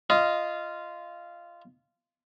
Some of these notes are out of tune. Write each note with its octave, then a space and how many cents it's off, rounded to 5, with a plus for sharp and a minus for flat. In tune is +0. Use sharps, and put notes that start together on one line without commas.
F4 -15 D#5 +0